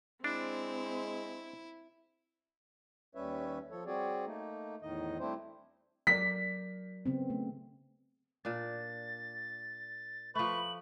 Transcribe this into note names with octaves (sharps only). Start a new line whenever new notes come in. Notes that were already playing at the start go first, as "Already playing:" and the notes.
G#3 C4 D4 E4
D#2 G3 C#4 B4 C#5 E5
F3 A4 C#5
G3 C4 F#4 G#4 C#5 D5
A3 A#3 D#4
E2 A2 D#3 D#4 D#5
G3 A3 C4 D4 E4 C5
F#3 A#4 D5 B6
C#3 B3 C4
A3
A#2 D4 A6
F3 A3 B4 B5 C#6 F#7